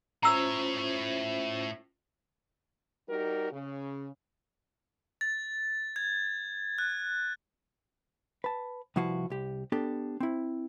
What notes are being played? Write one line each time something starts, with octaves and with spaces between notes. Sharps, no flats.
A2 C#4 F4 C5 C#5 A#5 E6
G3 D#4 F#4 G4 A#4
C#3
A6
G#6
F#6
B4 A5
C2 F3 E4 F#4 B4 F5
C2 G4
B3 D4 G4 A4
C4 E4